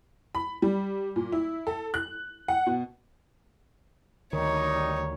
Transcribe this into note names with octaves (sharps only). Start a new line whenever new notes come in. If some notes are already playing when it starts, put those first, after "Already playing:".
B5
G3
A#2
E4
A4
F#6
F#5
B2
D2 D#3 G3 D#4 C#5